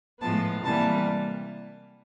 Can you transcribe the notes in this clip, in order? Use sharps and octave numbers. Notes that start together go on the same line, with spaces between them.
A2 F3 G#3 B3 A5
C3 E3 G3 A#3 A5